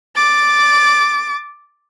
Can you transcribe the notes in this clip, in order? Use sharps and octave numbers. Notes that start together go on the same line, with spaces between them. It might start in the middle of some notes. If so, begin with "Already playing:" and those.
D6 A6